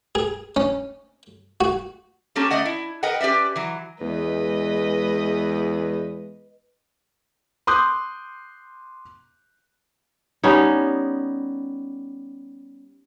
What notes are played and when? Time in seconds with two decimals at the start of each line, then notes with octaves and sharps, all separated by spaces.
0.15 G#4
0.56 C#4
1.61 F#4
2.36 G3 A#3 C#4 G4 A4
2.51 A3 D5 D#5 F#5
2.65 E4
3.03 A#4 B4 D#5 F#5 G5
3.21 C#4 G4 B4 D5 E5
3.56 E3 F#3
4.01 E2 G#3 B4 D#5
7.67 C6 D6 D#6 F#6 G6
10.44 G3 B3 C#4 D#4